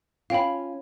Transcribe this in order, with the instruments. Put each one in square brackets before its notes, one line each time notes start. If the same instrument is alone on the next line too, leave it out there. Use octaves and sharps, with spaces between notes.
[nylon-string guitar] C#4 F4 [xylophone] F5 G5 B5